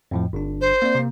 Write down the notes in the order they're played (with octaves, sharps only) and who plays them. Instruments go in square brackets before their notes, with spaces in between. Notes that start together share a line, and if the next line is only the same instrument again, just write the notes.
[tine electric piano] F2 A2 F3
G1 D4
[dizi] C5
[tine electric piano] A#3 C4 D5
C3 A#3